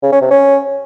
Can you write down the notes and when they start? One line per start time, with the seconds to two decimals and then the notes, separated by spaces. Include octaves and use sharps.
0.03 C#3
0.12 C#4
0.21 C3
0.31 C#4